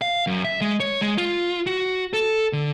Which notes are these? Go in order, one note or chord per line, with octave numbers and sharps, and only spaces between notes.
F5
F#2
E5
G#3
C#5
G#3
F4
F#4
A4
D3